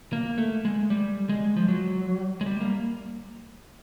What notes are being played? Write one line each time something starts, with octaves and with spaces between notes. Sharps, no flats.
A#3
A3
G#3
G3
G#3
F3
F#3
G#3
G3
A#3